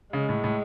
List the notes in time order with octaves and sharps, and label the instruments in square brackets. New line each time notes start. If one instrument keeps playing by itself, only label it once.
[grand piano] C#3 [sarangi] G#3
[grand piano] A2
A2